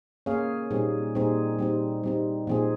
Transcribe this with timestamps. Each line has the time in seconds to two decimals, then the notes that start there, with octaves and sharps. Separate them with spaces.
0.26 A#3 C#4 G#4 C#5 F5
0.71 A#2 G3 C4 D#4 G#4
1.15 A#2 G3 C4 D#4 G#4
1.59 G3 C4 D#4
2.04 G3 C4 D#4
2.47 A#2 F3 C4 D#4 G#4